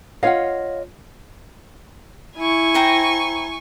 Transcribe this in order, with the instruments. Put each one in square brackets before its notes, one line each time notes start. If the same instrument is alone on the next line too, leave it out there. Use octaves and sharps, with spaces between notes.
[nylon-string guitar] F4 C#5 D#5 [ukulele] F5 F#5
[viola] E4 [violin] G#5 C#6
[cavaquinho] C5 G5 A#5